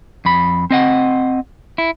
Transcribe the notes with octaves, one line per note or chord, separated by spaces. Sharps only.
F2 B5
C4 D#5 F#5
E4